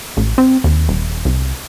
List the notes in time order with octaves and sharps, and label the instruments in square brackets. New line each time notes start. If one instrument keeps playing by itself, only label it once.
[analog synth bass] A1
C4
D#2
D#1
C2